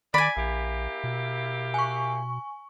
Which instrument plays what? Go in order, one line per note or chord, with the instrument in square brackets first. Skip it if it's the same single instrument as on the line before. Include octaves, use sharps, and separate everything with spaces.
[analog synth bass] D#3 [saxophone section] D5 [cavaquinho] G#5 B5
[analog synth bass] A#1 [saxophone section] A#3 E4 G4
[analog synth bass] B2
[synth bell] G#5 C#6